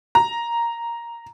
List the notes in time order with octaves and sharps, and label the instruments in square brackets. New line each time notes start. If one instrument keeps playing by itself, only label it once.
[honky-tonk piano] A#5